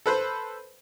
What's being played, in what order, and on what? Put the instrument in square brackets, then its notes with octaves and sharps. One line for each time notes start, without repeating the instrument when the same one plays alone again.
[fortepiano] A4 B4 C5